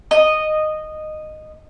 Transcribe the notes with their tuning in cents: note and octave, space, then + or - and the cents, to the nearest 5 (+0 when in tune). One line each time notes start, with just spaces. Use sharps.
D#5 -10